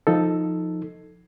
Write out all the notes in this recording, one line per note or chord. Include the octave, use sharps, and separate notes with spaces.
F3 D#4 A4